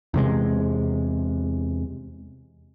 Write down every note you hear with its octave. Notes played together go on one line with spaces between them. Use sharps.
E2 C3 G#3